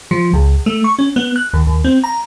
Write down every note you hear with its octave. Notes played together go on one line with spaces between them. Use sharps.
F3
C#2
A3
C#6
C#4
B3
F#6
D#2
D#2
C4
A#5